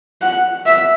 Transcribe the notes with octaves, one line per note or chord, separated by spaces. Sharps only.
F#5
E5